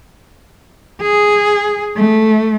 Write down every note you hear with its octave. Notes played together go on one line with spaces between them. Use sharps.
G#4
A3